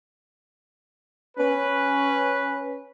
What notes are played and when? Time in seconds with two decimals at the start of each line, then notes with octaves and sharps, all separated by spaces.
1.37 C#4 B4